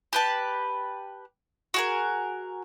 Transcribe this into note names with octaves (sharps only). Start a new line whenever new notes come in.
G4 B4 A5
F#4 G#4 A#4